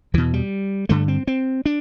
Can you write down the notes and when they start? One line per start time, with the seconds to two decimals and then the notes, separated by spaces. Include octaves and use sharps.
0.14 E2 B2 E3
0.34 G3
0.89 G2 D3 A3
1.08 C4
1.27 C4
1.66 D4